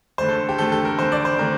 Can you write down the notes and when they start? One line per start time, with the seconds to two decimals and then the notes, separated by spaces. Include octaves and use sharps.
0.18 D3 A3 C4 C5
0.29 A4
0.49 G4
0.58 D3 A3 C4 A4
0.72 A4
0.85 A#4
0.99 D3 A3 C4 C5
1.12 D5
1.25 C5
1.39 D3 A3 C4 A#4